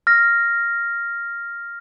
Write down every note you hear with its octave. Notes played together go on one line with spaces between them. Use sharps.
F6 A#6